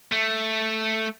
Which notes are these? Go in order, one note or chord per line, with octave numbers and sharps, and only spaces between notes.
A3